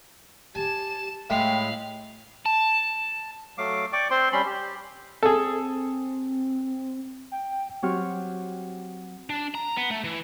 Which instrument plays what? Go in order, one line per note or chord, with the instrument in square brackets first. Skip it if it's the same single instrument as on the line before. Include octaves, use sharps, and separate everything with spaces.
[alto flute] G4 [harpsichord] G#5 [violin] A5 E7
[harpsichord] A2 G#3 [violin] F5 B5 [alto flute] G5
[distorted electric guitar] A5
[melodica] F#3 A3 F5 D6
D5 G5 C#6 D6
C4 C5 C6
G3 C#4 B5 C6
G4
[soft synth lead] C4 [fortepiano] G#4 A4
[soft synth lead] G5
[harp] F#3 C4 G4 C#6 F6
[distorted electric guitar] D4
A#5
B3
A3
E3